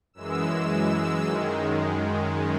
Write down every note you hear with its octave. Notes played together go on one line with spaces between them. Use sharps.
F#2 E3 G#3 E6
F#2 D#3 G#3